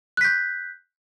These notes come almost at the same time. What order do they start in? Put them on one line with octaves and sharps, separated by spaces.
F#6 B6 G6